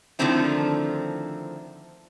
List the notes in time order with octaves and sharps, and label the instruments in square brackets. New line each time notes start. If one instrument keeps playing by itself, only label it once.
[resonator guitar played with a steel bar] D3 D#3 F3 A3 C4 E4